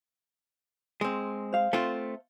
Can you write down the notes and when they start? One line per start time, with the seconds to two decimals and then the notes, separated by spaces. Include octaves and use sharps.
1.01 G#3 C4
1.52 C5 F5
1.73 A3 C4 F4